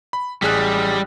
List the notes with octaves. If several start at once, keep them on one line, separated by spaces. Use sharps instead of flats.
B5
A1 G3 G#4 F#6